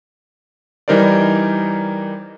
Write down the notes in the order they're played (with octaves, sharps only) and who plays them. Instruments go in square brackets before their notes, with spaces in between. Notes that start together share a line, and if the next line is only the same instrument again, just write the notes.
[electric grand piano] E3 G3 D#4 A#4 C5 D5